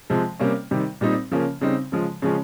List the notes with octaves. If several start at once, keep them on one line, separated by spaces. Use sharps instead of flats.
C3 F3 G#3
C3 G3 A#3 C#4
C3 D#3 G3
A#2 G3 C4 D#4
C#3 F3 A#3 C#4
C#3 G3 C4 D#4
C#3 F3 G#3
C#3 F3 G#3 C#4